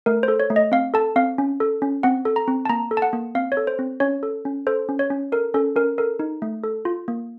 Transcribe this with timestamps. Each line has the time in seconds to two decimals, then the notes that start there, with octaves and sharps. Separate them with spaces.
0.06 A3 A#4
0.23 C5
0.28 A4
0.40 C#5
0.50 A3
0.56 D#5
0.72 C4 F5
0.94 A4 A5
1.16 C4 F5
1.38 C#4
1.60 A4
1.82 C#4
2.03 C4 F#5
2.25 A4
2.36 A#5
2.48 C4
2.65 A5
2.69 A#3 A#5
2.91 A4
2.97 A5
3.02 F#5
3.13 A#3
3.35 C4 F5
3.52 C#5
3.57 A4
3.67 C5
3.79 C4
4.00 C#4 C#5
4.23 A4
4.45 C#4
4.67 A4 C5
4.89 C#4
4.99 C#5
5.10 C#4
5.32 A4 A#4
5.54 C#4 A4
5.76 C#4 A#4
5.98 A4 A#4
6.19 D#4
6.42 A3
6.64 A4
6.85 F4
7.08 A#3